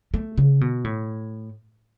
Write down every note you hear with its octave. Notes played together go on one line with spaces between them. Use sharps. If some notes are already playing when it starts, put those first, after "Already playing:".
A3
C#3
B2
A2